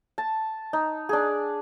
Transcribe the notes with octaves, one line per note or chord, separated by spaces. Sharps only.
A5
D#4
D4 G#4